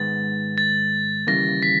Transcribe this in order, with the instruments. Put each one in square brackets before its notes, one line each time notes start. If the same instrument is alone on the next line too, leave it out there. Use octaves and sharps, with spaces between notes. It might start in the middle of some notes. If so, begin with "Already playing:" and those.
Already playing: [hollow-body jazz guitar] G#2 D#3 G#3 B3 [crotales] A6
[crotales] A6
[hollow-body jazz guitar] D#2 C#3 E3 G3 A#3 [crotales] A#6
[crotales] B6